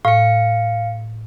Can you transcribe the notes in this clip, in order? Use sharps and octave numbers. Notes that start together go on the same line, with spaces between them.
A2 F5 C#7